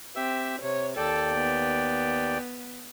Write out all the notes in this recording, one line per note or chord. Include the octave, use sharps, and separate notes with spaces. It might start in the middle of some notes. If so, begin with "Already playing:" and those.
C4 G4 E5 E6
C3 C#5
D#2 A4 D5 G5
B3